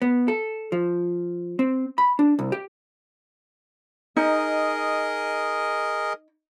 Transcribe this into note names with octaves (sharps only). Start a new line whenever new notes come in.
B3
A4
F3
C4
B5
D4
C2
G4
D#4 G#4 A#4 D#5